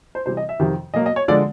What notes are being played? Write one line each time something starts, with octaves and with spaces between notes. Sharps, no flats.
C5
C3 E3 G3 C4 C5
D#5
E5
F2 C3 D#3
B2 F#3 A#3 D#5
D#5
C#5
D3 F3 G#3 D5